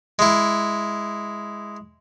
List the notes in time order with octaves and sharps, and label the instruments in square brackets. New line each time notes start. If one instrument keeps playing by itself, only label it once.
[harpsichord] G#3 E4